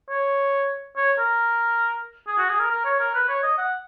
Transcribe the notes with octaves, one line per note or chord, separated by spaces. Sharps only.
C#5
C#5
A#4
G#4
F#4
G#4
A#4
A#4
C#5
A#4
B4
C#5
D#5
F#5